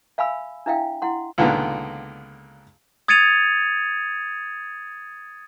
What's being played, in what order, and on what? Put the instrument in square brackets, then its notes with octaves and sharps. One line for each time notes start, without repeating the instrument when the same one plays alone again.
[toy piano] E5 F5 G#5 B5 E6
D4 E4 E5 F5 G5
E4 F#5 C6
[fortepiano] C#2 A#2 D3 D#3 B3
[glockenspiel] D#6 G#6 A6 C#7 D#7 F7